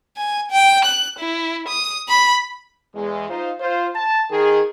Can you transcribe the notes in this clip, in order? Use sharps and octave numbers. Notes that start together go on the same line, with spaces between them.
G#5
G5
F#6
E4
D#6
B5
E2 G#3
D#4 F4 C5
F4 C5
A5
D#3 G#4